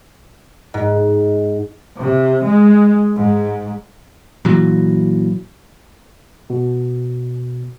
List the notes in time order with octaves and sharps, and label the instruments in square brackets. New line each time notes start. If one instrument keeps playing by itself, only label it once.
[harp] G#2
[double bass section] C3
G#3
G#2
[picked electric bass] A#2 E3 F#3
[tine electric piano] B2